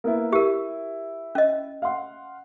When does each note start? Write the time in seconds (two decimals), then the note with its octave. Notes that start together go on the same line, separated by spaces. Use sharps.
0.04 A#3 B3 E4
0.33 E4 G4 A#4
1.35 C#4 D#5
1.82 F5 F#5 C6